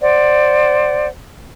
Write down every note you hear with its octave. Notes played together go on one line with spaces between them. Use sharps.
C5 D5 F#5